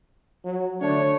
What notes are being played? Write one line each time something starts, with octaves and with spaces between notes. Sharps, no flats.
F#3
D3 A3 D4 C#5